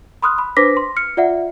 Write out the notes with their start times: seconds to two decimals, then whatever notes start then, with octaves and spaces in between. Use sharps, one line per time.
0.22 B5 C6 D#6 F6 F#6
0.38 B5
0.57 D4 B4 C5 D6 A#6 B6
0.77 C6
0.97 F6 C#7
1.17 F4 D5 E5 F#5